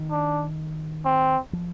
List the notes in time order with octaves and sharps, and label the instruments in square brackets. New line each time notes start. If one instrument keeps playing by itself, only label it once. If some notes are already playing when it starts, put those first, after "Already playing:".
Already playing: [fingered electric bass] D#3
[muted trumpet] D4
C4
[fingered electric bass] F3